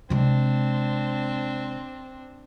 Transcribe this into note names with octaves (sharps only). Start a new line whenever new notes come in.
C3 G#3 C4 D4